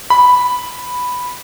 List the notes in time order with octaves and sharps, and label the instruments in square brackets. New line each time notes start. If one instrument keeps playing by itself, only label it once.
[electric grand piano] B5